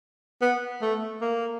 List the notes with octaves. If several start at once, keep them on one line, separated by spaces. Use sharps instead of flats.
B3
A3
A#3